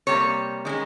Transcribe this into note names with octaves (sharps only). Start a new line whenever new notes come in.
C3 G3 A#3 C#5
D#3 G#3 C#4